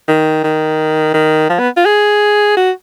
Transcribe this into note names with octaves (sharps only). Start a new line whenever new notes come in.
D#3
D#3
D#3
F3
B3
F4
G#4
F#4